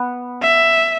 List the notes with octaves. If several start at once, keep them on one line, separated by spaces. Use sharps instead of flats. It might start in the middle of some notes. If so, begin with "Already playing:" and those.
Already playing: B3
E5